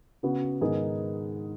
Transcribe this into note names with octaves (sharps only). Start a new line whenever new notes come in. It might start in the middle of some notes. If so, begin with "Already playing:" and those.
C#3 B3 F#4
G#2 D#3 B3 D#4 G#4